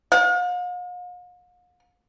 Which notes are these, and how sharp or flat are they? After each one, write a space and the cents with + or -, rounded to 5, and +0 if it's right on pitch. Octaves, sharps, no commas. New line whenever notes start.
F5 +45